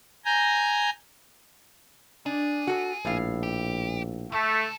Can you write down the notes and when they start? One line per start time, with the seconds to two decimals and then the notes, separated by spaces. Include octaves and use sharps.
0.25 G#5 A#5 G6
2.26 D4 G#4
2.67 F#4 A4
3.05 A#1 A2 F5
3.43 G4
4.32 C#2 A3 A4